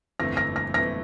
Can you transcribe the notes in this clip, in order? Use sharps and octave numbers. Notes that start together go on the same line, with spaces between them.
G1 F2 E3 A3 A#6
A#6
A#6
G1 F2 E3 A3 A#6